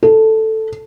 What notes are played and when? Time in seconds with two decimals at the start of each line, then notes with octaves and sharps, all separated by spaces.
0.03 A4